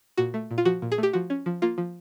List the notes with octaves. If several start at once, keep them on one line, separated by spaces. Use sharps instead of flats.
A#2 F#4
A3
A#2
F4
F3 F#4
A#2
G#4
A3 G4
F3 F#4
C#4
F3
A#3 F4
F3